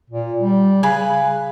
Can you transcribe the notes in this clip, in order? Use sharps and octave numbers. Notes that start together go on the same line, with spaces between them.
A#2
G3
C#3 G#4 B4 B5